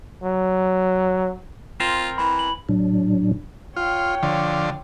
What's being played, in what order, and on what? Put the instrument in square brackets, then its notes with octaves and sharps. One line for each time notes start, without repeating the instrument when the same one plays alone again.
[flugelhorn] F#3
[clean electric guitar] C4 A#4 C5 [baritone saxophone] F4
[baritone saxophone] E3 [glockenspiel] B5
[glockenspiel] F#7
[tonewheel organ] A2 F#3 D4
[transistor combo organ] F4 [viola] C#5 G5
[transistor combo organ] D3 F3